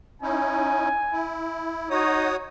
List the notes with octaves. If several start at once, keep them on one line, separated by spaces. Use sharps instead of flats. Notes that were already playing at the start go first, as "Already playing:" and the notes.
C#4 D#4 E4 G#5
E4
D#4 F#4 C#5 D#6